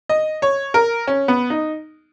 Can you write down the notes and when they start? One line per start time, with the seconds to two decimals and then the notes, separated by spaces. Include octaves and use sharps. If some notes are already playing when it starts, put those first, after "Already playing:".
0.09 D#5
0.42 C#5
0.74 A#4
1.07 C#4
1.28 B3
1.50 D#4